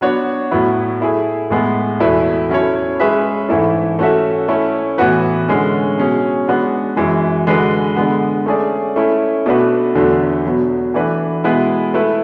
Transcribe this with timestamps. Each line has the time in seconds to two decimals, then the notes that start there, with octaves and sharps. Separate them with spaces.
0.01 F#3 B3 D4 F#4 C#5
0.51 A2 F#3 B3 E4
1.01 A3 E4 G#4
1.50 A2 G#3 B3
2.00 E2 B2 A3 E4 B4
2.49 F#3 C#4 E4 A4 C#5
3.00 G#3 C#4 G#4 B4 E5
3.49 G#2 E3 A3 E4 A4
3.99 A3 C#4 F#4 A4 E5
4.48 A3 C#4 E4
4.98 A2 E3 B3 F#4 B4
5.48 D3 G#3 C#4
5.98 B2 F#3 C#4 G#4 C#5
6.48 G#3 B3 D4 F#4
6.97 F#2 E3 G#3
7.47 D3 G#3 D4 F#4 B4
7.96 D3 G#3 B3
8.46 A3 C#4 G#4 D5
8.96 A3 C#4 E4
9.46 B2 A3 D4 F#4 B4
9.95 E2 D3 F#3 A3
10.45 B2 F#3 B3
10.94 E3 A3 D4 F#4 B4
11.44 B2 G#3 B3 E4 B4
11.94 A3 E4 B4